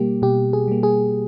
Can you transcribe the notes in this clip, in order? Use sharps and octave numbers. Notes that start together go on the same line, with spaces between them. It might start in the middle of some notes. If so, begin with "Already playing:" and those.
Already playing: B2 G3 A#3 G4
B2 G4
G#4
G3 A#3
G#4